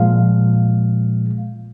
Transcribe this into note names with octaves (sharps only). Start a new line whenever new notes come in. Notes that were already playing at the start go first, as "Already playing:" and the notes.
Already playing: A#2 F3 G#3 F5